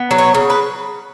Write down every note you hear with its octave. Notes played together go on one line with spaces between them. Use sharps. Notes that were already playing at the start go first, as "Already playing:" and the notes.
Already playing: B3
F#3
C#5
C#3
B4